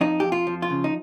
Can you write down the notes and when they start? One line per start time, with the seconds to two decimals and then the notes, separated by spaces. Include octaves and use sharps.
0.01 F2 D#4
0.20 F2 G4
0.32 F4
0.47 F3
0.62 F4
0.70 C#3
0.84 D#4